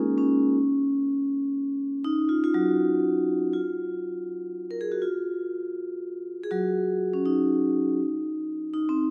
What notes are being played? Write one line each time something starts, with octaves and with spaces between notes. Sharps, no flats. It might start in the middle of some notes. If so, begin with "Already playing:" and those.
Already playing: G#3 A#3 C#4 D#4 F4 G#4 A#4
C#4
D#4
F4
F4
F#3 F#4
F4
A#4
G#4
F#4
F4
G#4
F#3 F#4
C#4
D#4
D#4
C4